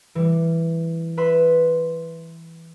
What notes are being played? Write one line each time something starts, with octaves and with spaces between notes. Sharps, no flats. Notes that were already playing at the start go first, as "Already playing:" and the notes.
E3 G3
B4 E5 B5 C6